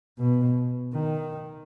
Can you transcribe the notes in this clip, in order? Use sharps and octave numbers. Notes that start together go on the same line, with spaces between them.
B2
D#3